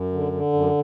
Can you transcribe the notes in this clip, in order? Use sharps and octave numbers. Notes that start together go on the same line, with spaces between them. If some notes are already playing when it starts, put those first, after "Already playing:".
Already playing: F#2
D3
D3
F#2